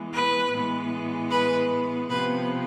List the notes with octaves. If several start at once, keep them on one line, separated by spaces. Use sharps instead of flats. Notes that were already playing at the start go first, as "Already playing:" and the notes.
Already playing: E3 G#3 B3
B4
A2 E3 G#3 B3
B4
C3 F3 B3 B4